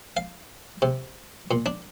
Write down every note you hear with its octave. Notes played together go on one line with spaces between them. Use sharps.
F5
C3
A#2
D4